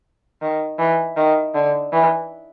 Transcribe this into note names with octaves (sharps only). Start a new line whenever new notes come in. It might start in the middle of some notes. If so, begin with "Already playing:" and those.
D#3
E3
D#3
D3
E3